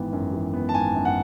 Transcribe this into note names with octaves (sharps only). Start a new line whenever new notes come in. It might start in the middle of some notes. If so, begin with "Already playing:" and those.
Already playing: G#1 E3 B3
F#2
E3
B3
A5
G#1 G#5
F#2
F#5